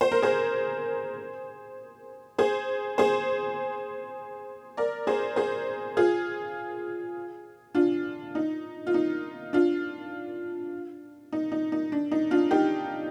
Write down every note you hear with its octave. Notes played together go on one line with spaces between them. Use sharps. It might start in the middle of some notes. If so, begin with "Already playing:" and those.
C5
A#4
G#4 C5
G#4 C5
G#4 C5
A#4 D5
G#4 C5
G#4 C5
F4 G#4
D4 F4
D#4
F4
D#4
D4 F4
D#4
D#4
D#4
D4
D#4
D4 F4
D#4 G4